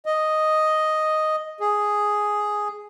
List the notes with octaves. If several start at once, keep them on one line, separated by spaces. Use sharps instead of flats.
D#5
G#4